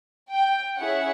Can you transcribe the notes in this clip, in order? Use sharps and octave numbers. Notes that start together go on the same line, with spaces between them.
G5
C#4 E4 G#4 F#5